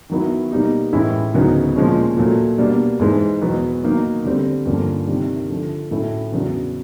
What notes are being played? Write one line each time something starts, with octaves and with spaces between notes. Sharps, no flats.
D#3 F#3 B3 E4
B2 G3 A#3 D#4 G4
A2 E3 G#3 C#4 E4
D2 C#3 F#3 B3 D#4
A#2 F3 G#3 C#4
A#2 F#3 A3
B2 G3 A#3 D4
G#2 E3 G#3
E2 B2 F#3 B3
D#3 F#3 A#3 D#4
D3 G3 C4
G2 D3 F3 A#3 C#4
C3 D#3 G3
D3 F3 A3
A2 F#3 A3 C#4 E4
E2 C#3 F#3 B3 D4